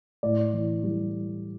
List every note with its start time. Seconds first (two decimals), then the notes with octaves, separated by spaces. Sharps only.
0.23 A2 D5
0.53 E3
0.84 G3